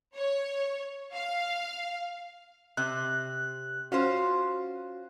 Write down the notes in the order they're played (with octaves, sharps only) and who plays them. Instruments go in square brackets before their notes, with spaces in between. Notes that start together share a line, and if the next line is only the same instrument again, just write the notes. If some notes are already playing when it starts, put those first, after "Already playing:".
[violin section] C#5
F5
[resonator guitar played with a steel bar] C3 [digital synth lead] F#6
[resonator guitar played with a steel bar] C#4 F4 C5 [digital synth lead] F#4